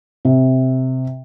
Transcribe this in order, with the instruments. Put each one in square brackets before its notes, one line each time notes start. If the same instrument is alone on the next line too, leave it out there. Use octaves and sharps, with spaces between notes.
[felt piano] C3